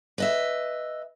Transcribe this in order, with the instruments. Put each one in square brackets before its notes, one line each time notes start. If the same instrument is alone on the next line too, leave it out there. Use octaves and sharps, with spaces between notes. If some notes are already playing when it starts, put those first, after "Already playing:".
[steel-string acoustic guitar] B4 D#5 E5